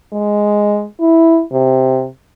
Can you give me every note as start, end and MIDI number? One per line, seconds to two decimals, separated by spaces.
0.13 0.85 56
1.00 1.42 64
1.52 2.07 48